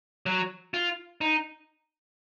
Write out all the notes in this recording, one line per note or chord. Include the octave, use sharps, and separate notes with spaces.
F#3
F4
D#4